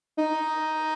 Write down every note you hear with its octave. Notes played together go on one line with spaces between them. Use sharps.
D#4